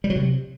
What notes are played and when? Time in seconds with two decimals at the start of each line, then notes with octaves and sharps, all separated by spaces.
0.04 G3
0.10 F#3
0.16 C3